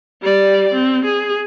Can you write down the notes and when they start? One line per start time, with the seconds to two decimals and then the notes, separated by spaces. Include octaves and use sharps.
0.21 G3 D5
0.73 C4
1.05 G#4